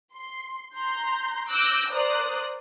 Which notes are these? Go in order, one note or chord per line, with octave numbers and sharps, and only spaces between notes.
C6
A#5 C6 G6
D6 E6 F#6 G6 A#6 D7
A#4 C5 D5 D#6 F#6